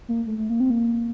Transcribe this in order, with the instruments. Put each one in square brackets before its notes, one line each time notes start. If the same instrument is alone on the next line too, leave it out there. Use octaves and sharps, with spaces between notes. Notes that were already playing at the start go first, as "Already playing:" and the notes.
[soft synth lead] A#3
A3
A3
A#3
C4
A#3